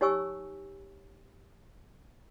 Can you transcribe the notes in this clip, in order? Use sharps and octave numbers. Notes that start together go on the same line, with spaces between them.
D#4 G4 C#5 G#5 C#6 E6